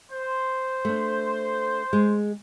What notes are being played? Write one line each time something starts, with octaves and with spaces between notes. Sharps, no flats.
C5
A3 D4
G#3